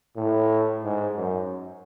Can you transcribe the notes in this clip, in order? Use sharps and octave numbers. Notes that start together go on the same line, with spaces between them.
A2
G#2
F#2